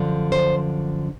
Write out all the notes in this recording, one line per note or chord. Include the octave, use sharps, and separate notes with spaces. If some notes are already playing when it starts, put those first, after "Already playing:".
Already playing: F#2 D3 F3
C5